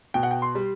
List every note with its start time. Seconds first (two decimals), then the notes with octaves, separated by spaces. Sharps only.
0.14 B2 G5
0.23 F#5
0.31 G5
0.42 C6
0.55 G3